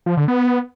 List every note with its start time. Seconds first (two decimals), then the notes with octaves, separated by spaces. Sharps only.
0.06 F3
0.17 D3
0.28 B3